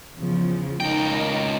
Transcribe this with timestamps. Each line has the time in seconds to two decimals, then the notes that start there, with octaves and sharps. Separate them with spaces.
0.18 E2 C#3 F3
0.80 C#2 D#4 A#4 G5